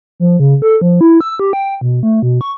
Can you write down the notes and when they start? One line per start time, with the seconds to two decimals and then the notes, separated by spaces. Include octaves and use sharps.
0.20 F3
0.40 C#3
0.62 A4
0.81 F3
1.01 E4
1.21 E6
1.39 G4
1.53 G5
1.81 B2
2.03 A3
2.22 B2
2.41 C#6